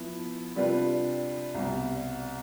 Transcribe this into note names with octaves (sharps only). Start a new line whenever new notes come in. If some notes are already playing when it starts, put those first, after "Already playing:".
Already playing: F3 B3 E4
C3 G3 D4 F4 B4
C2 B2 G3